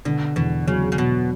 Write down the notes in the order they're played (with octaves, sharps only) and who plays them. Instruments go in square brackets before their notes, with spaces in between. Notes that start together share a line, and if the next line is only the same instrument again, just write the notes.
[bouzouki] B2 [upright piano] D3
[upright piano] E2 [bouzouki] B2
[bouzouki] C#3 [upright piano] F#3
[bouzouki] C#3
[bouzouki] B2 [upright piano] F#3